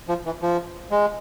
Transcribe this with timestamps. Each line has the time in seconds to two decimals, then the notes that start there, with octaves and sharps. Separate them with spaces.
0.09 F3
0.26 E3
0.42 F3
0.91 G#3